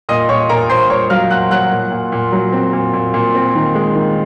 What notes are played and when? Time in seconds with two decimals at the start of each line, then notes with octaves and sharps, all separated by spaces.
0.09 A#2 D#5 D#6
0.29 A#2 C#5 C#6
0.49 A#2 A#4 A#5
0.69 A#2 C5 C6
0.90 A#2 C#5 C#6
1.10 F#3 F5 F6
1.30 A#2 F#5 F#6
1.51 F#3 F#5 F#6
1.71 A#2
1.92 A#2
2.12 A#2
2.32 F#3
2.52 C4
2.73 A#2
2.93 A#2
3.14 A#2
3.35 C4
3.55 D#3
3.75 G#3
3.95 D#3